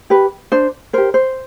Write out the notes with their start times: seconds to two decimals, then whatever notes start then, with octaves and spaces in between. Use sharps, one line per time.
0.10 G4 B4
0.52 D4 C5
0.93 G4 A#4 C5
1.14 C5